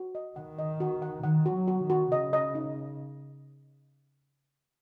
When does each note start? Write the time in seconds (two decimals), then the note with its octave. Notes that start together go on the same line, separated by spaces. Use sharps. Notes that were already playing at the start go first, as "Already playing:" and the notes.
Already playing: F#4
0.15 D#5
0.36 D#3 F#5
0.59 D#5
0.80 F#4
1.02 F#5
1.23 D#3 F#5
1.46 F#4
1.53 F#3
1.68 F#4
1.82 D#3
1.90 F#4
2.11 C#3 D#5
2.33 D#5
2.55 D#4